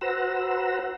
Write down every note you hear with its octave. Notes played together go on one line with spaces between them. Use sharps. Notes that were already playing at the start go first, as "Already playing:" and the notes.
F#4 B4 C5 F#5 A#5 E6